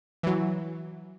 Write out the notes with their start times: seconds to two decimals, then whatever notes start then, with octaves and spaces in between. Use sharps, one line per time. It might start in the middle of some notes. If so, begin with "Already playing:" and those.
0.23 E3 F#3